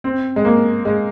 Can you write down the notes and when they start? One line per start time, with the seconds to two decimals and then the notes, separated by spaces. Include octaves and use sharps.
0.04 C4
0.36 G#3
0.45 A#3
0.85 G#3